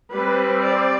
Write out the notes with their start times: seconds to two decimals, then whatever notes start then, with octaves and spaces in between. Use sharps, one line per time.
0.11 G3 C4 B4
0.63 D5